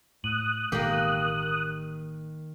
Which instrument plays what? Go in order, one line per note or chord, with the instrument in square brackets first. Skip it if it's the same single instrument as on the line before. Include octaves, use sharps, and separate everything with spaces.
[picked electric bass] A2 [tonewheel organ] D#6 F#6
[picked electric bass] A1 B2 G#3 [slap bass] D#3 [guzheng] A#3 G4